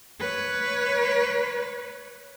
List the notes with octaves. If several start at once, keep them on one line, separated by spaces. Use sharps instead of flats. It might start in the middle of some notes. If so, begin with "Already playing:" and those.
B4 C#5